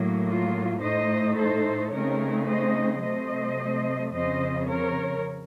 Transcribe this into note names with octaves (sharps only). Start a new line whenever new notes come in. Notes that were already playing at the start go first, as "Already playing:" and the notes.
Already playing: A2 F#3 A#3
F4
A2 A3 D#4 C5 D#5
A4 C5
C#3 A3 C4 D#4 A#4 C#5
C5 D#5
C3 F#3 A3 C4 C5 D#5
F2 C#3 F3 C4 C5 D#5
A#4 C#5